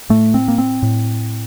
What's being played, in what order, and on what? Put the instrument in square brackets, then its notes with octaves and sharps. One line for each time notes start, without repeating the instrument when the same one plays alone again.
[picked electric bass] A2 A3
C4
A#3
C4
A2